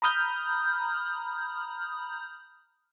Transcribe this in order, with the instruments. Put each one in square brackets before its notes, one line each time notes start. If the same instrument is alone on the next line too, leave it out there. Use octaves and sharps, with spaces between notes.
[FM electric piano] A#5 B5 D#6 F6 G6